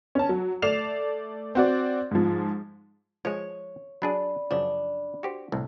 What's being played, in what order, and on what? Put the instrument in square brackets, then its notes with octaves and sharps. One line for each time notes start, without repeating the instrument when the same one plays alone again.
[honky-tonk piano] C#4 A5
F#3
A3 D5 C7 E7 F7
C4 F#4 D5
G#2 F3
[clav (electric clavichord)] F3 G#3 [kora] C#5
[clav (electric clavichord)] F#3 D4 G#4 [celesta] D5 B5
[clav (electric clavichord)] F#2 C#3 F3 [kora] D4
[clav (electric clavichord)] F#4 G4 C5
C2 A2